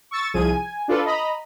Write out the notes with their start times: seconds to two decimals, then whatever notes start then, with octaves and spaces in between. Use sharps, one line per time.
0.11 C#6 E6 A6
0.34 C2 F3 G#4 G#6 D#7
0.49 G#5
0.88 D4 F4 A4 B4
1.05 D#5 A#5 B5